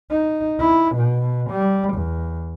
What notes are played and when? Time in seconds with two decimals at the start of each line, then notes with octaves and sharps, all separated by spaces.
0.11 D#4
0.59 E4
0.96 B2
1.50 G3
1.94 E2